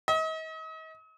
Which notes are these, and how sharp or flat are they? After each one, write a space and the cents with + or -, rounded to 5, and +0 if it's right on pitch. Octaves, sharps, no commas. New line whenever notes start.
D#5 +40